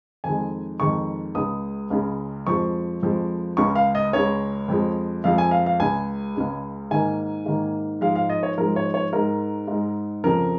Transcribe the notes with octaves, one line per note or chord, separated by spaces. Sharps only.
F2 D#3 G#3 G#5
F2 D#3 G#3 C#6
C#2 C#3 G#3 D#6
C#2 C#3 G#3
F2 F3 G#3 C#6
F2 F3 G#3
C#2 C#3 G#3 C#6
F5
D#5
C#2 C#3 G#3 C#5
F2 F3 G#3
F2 F3 G#3 F5
G#5
F5
F5
C#2 C#3 G#3 G#5
C#2 C#3 G#3
G#2 D#3 A#3 G#5
G#2 D#3 A#3
G#2 F3 G#3 F5
F5
D#5
C#5
G#2 F3 G#3 A#4
C#5
C#5
G#2 G#3 A#4
G#2 G#3
F2 C#3 F3 A#4